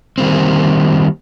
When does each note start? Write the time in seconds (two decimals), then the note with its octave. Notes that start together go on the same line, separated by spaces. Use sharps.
0.18 D#3 G3 A#3 C4